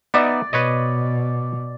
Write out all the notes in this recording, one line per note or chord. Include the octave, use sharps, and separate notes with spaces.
B3 D#4 D5 E5
B2 B4 C#5 D#5